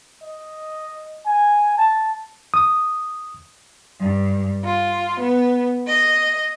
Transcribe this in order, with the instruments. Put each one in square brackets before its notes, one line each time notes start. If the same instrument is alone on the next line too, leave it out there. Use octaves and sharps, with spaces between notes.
[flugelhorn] D#5
G#5
A5
[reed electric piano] D#6
[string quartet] G2
F4
B3
D#5